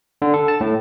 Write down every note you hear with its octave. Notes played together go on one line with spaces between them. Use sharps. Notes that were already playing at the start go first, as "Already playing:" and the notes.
D3
A4
A5
A2